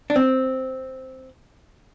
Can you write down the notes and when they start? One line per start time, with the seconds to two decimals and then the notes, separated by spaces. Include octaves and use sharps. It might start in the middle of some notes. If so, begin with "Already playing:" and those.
0.10 D4
0.16 C4